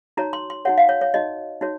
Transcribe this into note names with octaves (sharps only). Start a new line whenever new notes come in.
D#4 F#4 C#5 A#5
C6
C6
D#4 F#4 C#5 F#5
F5
C#5
C#5
D#4 F#4 C#5 D#5
D#4 F#4 C#5